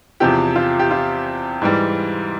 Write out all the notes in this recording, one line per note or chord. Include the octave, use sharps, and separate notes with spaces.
E2 C3 F3 G4
F4
G4
F4
G#2 E3 G3